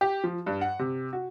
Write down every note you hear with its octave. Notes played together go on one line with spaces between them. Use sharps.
G4
F3
G2
F#5
C3
F#4